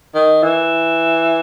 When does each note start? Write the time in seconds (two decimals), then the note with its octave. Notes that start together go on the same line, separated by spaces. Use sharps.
0.15 D#3
0.43 E3